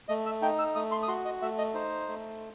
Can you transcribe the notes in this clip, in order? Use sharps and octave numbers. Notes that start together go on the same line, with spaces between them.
A3 D#5
E5
D#4 G5
E6
A3 D#6
C6
D#6
F#4 C6
D#5
A3 E5
D#5
D#4 C5
A3